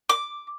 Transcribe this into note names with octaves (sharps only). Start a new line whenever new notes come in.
D6